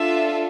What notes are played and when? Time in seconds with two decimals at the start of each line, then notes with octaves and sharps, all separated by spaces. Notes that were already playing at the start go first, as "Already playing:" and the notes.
Already playing: D4 F4 A4 E5